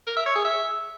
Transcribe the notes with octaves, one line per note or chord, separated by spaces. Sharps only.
A#4
E5
C#5
G#4
E5